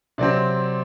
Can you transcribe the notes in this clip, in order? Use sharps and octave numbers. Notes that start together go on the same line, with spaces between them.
C3 F#3 C4 D5